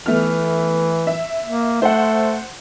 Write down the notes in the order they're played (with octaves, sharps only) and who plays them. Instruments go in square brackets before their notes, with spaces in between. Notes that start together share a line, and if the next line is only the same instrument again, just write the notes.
[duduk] E3 [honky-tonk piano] A3 B3 F6
[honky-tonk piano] E5
[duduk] A#3
[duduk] A3 [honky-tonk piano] C5 F#5